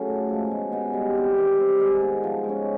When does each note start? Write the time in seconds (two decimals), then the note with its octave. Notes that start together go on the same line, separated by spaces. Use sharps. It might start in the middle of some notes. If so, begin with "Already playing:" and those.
Already playing: C#3 F#3 A3 C#4
0.08 A2
0.29 F3 G#3
0.51 B2
0.72 G#3 B3 D#4
0.93 G3
1.15 C4 E4 G4
1.38 D#3
1.58 G3 C4
1.80 G#3
2.02 B3 D#4
2.24 F3
2.44 G#3 C#4